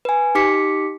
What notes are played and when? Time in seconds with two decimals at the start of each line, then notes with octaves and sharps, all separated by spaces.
0.05 B4 G#5
0.35 D#4 G4 D6 B6 C#7